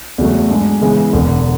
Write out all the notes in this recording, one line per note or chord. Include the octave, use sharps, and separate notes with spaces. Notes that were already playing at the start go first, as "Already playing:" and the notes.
E2 C#3 F#3 A3
G#2 G#3 D4
C#3 E3 G#3 B3
E1 E2 D3